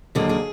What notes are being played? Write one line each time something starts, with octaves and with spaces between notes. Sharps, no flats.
D#2 D3 F#3 A#3 G#4
G#4